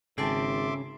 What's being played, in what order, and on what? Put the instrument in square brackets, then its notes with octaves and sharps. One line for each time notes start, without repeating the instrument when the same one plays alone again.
[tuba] G#1 [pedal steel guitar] C#3 [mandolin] G#4 G5 A5 [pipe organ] E5 C6 D6